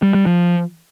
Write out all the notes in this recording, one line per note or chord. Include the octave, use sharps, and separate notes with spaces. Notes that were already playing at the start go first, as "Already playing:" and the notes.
G3
G3
F3